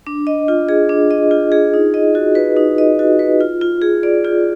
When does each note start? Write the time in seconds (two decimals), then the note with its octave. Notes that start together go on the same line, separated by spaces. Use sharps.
0.07 D4
0.27 D#5
0.48 F4
0.69 G#4
0.89 D4
1.11 D#5
1.31 F4
1.52 G#4
1.74 D#4
1.94 D#5
2.15 F#4
2.35 B4
2.57 D#4
2.78 D#5
2.99 F#4
3.19 B4
3.41 F4
3.61 F4
3.82 G#4
4.03 D5
4.25 F4